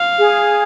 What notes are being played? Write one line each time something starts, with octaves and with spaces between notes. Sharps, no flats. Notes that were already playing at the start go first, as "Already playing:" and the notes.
Already playing: F5
G#4